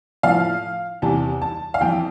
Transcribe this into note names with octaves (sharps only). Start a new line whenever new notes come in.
A2 F3 F5
E2 C3 E3 A5
A5
F5
F2 E3 G5